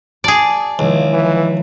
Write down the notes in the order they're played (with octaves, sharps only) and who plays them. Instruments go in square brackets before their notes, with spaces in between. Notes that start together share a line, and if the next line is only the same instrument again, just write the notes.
[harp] F#4 A5 [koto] G#4 D5
[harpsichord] C#2 [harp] D#3 F3 E4
[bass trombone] E3